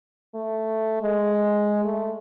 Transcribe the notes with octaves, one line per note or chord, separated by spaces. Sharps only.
A3
G#3
A3